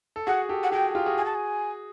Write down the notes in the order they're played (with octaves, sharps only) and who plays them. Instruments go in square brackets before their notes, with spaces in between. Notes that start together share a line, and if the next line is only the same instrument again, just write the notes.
[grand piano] A4
[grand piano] F#4 G#4 [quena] F#5
[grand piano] G4 A4
[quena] F#5
[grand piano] F#4 G#4 [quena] G5
[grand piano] F4 G4
F#4 G#4
[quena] G#5
A5
G#5